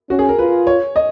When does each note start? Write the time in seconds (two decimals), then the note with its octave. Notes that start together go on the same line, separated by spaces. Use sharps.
0.10 C#4 F#4
0.19 G#4
0.29 A#4
0.38 F4 B4
0.67 C#5
0.96 D#5